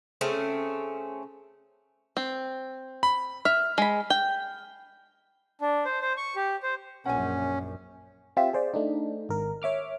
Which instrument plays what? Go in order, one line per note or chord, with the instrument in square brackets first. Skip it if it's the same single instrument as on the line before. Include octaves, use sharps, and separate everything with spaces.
[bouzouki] C#3 A3 C4 C#4
[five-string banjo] C4
[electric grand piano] B5
[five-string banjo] E5 [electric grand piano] F6
[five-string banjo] G#3 B5
G5
[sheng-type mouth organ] D4
C5
C5
C#6
G4
C5
[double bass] A#1 F#2 [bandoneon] C#4 [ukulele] F#5 G#5
[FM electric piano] C4 F4 G4 E5
G#4 C5 D5
A3 D4 D#4
G#1 A#4
C#5 E5 D6 F6